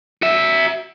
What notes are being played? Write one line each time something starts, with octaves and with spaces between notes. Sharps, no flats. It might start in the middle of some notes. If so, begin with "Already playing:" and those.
F#4 E5